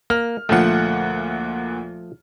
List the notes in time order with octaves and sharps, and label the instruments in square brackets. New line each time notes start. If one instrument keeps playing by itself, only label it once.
[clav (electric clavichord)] A#3 [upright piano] F6
[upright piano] D2 A#2 F#5 [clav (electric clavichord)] F3 A3